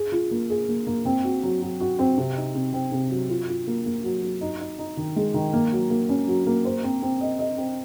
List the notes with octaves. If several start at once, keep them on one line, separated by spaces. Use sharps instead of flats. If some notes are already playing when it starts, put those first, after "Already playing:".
Already playing: G#4
F4
A#3
G#4
A#3
A#3
C4
F#4
F#3
F#3
F#4
C4
C3
D#4
C3
C4
C3
F#3
F4
F4
A#3
A#3
F#3
F#3
D#4
D#4
D#4
D#3
G#3
D#3
A#3
F#3
A#3
C#4
F#3
A#3
C5
C4
C4
D#5
D#5
C4